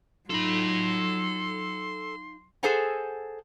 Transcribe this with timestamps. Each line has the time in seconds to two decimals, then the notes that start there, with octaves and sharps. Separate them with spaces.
0.30 F#3 D#4 F4 A4 B5 C6
2.63 G#4 A4 C5 F#5 G#5 A#5